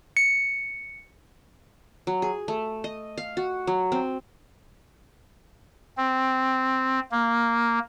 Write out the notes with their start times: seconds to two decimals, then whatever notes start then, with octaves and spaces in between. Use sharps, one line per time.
0.17 C#7
2.07 F#3
2.22 G#4
2.48 A3
2.84 D#5
3.18 F5
3.37 F#4
3.67 F#3
3.92 C4
5.97 C4
7.12 A#3